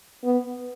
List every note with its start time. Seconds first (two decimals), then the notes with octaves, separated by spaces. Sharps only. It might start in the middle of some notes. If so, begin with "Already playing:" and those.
0.24 B3